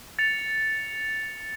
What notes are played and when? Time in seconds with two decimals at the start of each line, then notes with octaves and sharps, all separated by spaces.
0.19 A6 C#7 F7